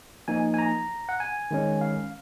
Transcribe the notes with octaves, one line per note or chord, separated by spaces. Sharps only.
F3 A#3 D#4 G#5
G#5
A#5
F#5
G#5
D#3 G#3 C#4
F5